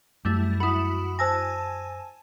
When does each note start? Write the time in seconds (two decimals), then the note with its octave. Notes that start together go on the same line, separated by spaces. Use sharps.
0.25 F#2 G3 A3 E4
0.60 E4 F#4 B5 D#6
1.19 C5 G#5 A5 E6 A#6